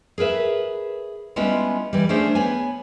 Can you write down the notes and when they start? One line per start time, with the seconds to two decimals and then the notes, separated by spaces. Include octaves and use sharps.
0.18 G#4 A#4 B4 E5
1.36 G3 G#3 B3 C#4 E4 F4
1.93 E3 G3
2.09 A3 C#4 D4 G#4 C5
2.35 B3 C#5 G#5